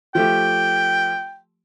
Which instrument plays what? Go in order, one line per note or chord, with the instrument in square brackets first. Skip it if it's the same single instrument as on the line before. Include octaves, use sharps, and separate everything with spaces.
[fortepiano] F3 A3 G4 [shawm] G5